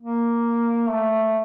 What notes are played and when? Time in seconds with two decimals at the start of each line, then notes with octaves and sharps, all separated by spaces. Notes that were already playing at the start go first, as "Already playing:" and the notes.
0.02 A#3
0.90 A3